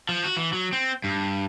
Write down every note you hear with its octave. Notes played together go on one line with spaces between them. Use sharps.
F3
F#4
E3
F#3
C4
G2